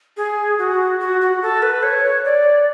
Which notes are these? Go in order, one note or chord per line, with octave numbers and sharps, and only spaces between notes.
G#4
F#4
F#4
F#4
A4
B4
C#5
D5